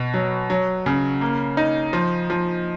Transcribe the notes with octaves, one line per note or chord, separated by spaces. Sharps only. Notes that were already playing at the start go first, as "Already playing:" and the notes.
Already playing: B2
F#3
F#3
C#3
A#3
D#4
F3
F3